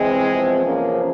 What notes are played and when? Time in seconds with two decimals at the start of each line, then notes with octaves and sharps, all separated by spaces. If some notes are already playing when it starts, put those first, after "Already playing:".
Already playing: E2 C3 E3 G#3 C4
0.30 E2 C3 F3
0.64 A#3 C#4